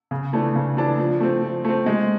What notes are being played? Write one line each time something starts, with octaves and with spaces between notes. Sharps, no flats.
C#3
E3 A3 D4
C#3
E3 A3 D4
F3
A3 C4
F3
A3 C4
G#3